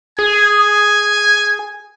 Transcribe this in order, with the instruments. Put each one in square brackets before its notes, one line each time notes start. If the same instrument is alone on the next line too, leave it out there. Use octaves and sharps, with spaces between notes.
[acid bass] G#4 [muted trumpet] G#5